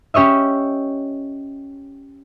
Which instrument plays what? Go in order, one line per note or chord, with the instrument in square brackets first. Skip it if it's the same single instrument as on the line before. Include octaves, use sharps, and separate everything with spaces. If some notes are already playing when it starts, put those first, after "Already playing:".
[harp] C#4 G4 C#5 D#5 E5